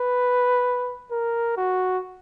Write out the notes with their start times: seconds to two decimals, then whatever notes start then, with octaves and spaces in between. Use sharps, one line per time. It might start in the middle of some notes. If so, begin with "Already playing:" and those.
Already playing: B4
1.11 A#4
1.57 F#4